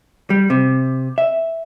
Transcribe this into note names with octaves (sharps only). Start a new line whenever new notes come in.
G3
C3
E5